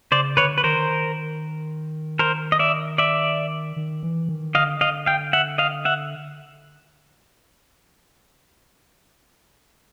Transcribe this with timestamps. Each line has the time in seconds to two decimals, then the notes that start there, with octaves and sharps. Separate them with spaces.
0.11 C#3 C5 D5
0.37 D3 B4 C#5
0.58 B4
0.64 D#3 A#4 C5
2.19 A#4 C5
2.52 D#5
2.59 D5 E5
2.98 D5 E5
3.76 D#3
4.03 E3
4.29 D#3
4.54 D3 D#5 F5
4.81 D#5 F5
5.06 F5 G5
5.33 E5 F#5
5.58 D#5 F5
5.85 E5 F#5